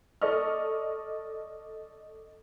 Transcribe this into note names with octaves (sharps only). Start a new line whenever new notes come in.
A4 D5 D#5 C#6 F6